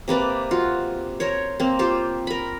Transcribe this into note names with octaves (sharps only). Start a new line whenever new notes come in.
C3 A#3 B4 D5
F4 F#4
A#4 C5 C#5
A#3 C4
F4 G4 C5
A#4 B5